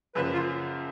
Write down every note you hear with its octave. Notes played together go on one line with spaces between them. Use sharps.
F#2 C#3 F3 A#3 B4
F4